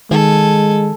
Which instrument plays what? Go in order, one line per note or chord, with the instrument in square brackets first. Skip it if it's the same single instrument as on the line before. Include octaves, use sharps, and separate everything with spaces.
[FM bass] D#3 [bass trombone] G#3 [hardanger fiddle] A4 G#5